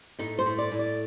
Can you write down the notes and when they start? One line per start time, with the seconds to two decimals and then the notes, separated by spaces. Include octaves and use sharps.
0.19 A2 D#4
0.39 C5
0.46 A2
0.58 D5
0.71 A2
0.79 D5